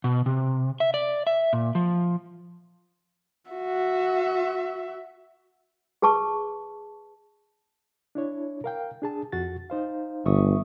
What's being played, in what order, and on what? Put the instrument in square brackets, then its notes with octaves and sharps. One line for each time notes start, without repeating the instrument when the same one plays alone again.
[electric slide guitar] B2
C3
E5
D5
E5
A#2
F3
[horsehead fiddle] F#4 E5
[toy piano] G#4 B4 A5 C#6
[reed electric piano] D4 E4 C#5
A#4 F5 G5
D4 G#4 A5
F2 F#4 A6
D#4 C5 F5
[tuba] G1 [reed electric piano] E5 C#6 D#6